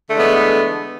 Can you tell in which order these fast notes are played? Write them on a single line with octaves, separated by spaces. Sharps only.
D3 A3 E3 G#3 B3